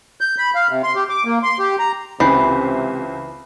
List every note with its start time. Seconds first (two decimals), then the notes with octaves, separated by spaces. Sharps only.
0.21 G6
0.38 B5
0.55 F5
0.70 C3
0.83 C6
0.95 G4
1.09 D6
1.25 A#3
1.43 C6
1.59 G4
1.79 A#5
2.20 C#2 C3 E3 B5 G6 C7